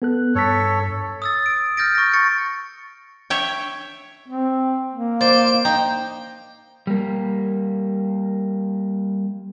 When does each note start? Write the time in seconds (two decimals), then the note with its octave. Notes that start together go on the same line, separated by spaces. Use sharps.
0.02 B3 A4 F#6
0.35 G2 A4 C#5 B6
1.22 D#6 E6 A6
1.46 D7
1.77 F6 G6 A6 A#6 D7
1.95 C#6 A#6
2.14 C#6 A6 C#7
3.30 C#5 E5 G5
4.28 C4
4.93 A#3
5.21 C5 D5
5.65 D#4 G5
6.87 G3 A#3